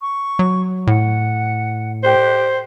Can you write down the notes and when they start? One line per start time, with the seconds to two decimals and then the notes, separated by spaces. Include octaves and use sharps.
0.01 C#6
0.39 F#3
0.87 A2 F#5
2.04 G4 C5